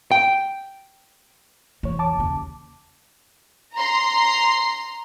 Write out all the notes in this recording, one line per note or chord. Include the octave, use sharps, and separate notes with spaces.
G5
C2 E3 C#5
E2 A5 D6
D#2 C#3
A#5 C6